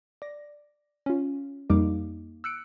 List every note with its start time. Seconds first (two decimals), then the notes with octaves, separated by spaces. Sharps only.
0.22 D5 A#6
1.06 C#4 F4
1.70 F2 G3 A#3 D#4 F5 D6
2.44 E6 F#6 C#7 D7